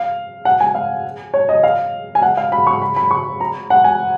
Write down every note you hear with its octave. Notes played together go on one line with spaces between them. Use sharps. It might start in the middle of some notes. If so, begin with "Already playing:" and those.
Already playing: F5
F#5
G#5
F5
C#5
D#5
F5
G#5
F#5
F5
B5
C#6
B5
B5
C#6
A#5
F#5
G#5